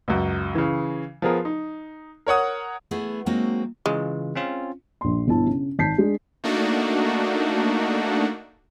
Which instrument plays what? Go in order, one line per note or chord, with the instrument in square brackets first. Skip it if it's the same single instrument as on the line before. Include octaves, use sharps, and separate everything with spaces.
[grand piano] C#2 F#2
C#3 E3
F3 B3 G#4 A#4
D#4
A#4 C#5 F#5 D#6
[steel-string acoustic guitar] A3 B3 E4 G#4 F#5
F#3 G#3 A#3 C4 D#4 F#4
[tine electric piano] C#3 E3 F4 [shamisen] G#3
[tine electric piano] C4 C#4 F4
[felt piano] A#1 C6
G1 B2 E4 A5
C#3
G#1 A5 G6 B6 C7
G#3 D4
[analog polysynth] A3 A#3 D4 D#4 F#4